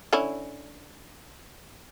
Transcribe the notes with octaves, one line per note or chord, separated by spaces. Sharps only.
D3 C#4 E4